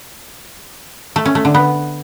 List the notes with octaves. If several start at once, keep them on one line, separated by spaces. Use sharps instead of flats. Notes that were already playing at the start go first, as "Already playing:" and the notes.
A3
C#4
A3
D3
B3